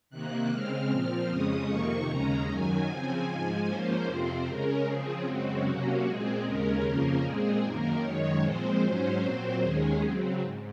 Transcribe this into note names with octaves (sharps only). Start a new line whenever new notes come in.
C3 D#3 A#3 F#6
C#3 G#3 C4 F6
A#2 F3 C4
F2 C#3 G#3 C#4 D#6
F2 C3 D#3 A#3 C#6
D#2 C#3 G#3 C#4 A#5
F#2 D#3 F#3 G#5
C#3 F3 C4
G#2 F3 G#3
G#2 F3 A#3 C#4 C5
F2 C3 F3 C4 C5
C#3 G#3 C#4 A#4
C#3 F3 C4 G#4
F#2 C#3 G#3 C4 F#4
C3 F#3 A#3 C#4
A#2 G#3 C4 G#4
D#2 C#3 G#3 C#4 A#4
F2 C#3 F3 A#3 C#4 A#4
A#2 G#3 C4 G#4
F#2 D#3 A#3 A#4
F#2 D#3 G#3 C#5
A#2 F3 G#3 C4 C5
G#2 F#3 C#4
A#2 F#3 C4
D#2 D#3 G#3 C#4 G#4
C#3 F#3 C4
G#2